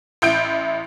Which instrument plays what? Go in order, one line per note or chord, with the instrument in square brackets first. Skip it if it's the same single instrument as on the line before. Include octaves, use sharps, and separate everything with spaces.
[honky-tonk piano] A1 E4 G6 D7